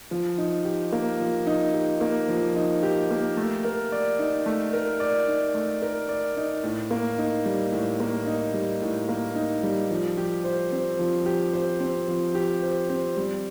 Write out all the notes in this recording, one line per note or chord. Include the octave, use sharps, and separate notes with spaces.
F3
D#4
G4
A#3
F3
D#4
G4
A#3
F3
D#4
G4
A#3
A3
A#4
D5
D#4
A3
A#4
D5
D#4
A3
A#4
D5
D#4
A2
A#3
D#4
G3
A2
A#3
D#4
G3
A2
A#3
D#4
G3
F3
G4
C5
C4
F3
G4
C5
C4
F3
G4
C5
C4
G3